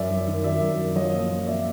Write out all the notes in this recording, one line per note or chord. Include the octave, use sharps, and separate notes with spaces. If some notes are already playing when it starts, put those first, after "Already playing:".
Already playing: F#2 D5 E5
F#2
D#3
F#3 D5 E5
F#2
F#2
F3 C#5 D#5
A#2
F3
A#2 D5 E5